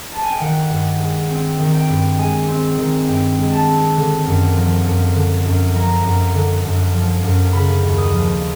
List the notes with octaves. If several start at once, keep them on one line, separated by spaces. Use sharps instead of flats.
A5
G#5
G5
D#3 F#5
G2
G#3
C4 G5
D#3
G5
G2
G#3 G#5
C4
D#3
G2 G5
G#3
A5
C4
D3
F#2
F3
F#2
D3
F#2
F3 A#5
F#2
D3
F#2
F3
F#2
C#3 B5
D#2
D#6
F3